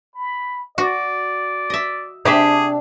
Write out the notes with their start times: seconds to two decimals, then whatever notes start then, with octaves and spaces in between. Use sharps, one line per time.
0.15 B5
0.78 F#4 D5
1.70 D#5 E5
2.25 C3 D4 G4 G#4 E5